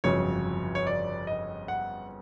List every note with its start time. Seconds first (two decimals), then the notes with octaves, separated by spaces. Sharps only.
0.04 G1 F2 C#3 F#3 C#5
0.75 C#5
0.87 D5
1.27 D#5
1.68 F#5